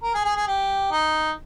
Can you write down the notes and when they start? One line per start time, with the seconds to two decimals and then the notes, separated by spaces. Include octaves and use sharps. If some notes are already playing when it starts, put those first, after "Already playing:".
0.03 A#4
0.15 G#4
0.25 G#4
0.36 G#4
0.47 G4
0.91 D#4